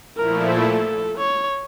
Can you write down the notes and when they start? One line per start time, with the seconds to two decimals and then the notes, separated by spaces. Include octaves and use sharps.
0.17 A#2 F3 A3 E4 A#4
0.51 A4
1.17 C#5